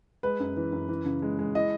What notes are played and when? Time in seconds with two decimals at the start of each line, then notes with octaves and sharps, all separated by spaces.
0.23 G#3 B4
0.40 F#2
0.57 E3
0.73 F#2
0.89 E3
1.06 C#3
1.22 G#3
1.39 G#3
1.55 E4 D#5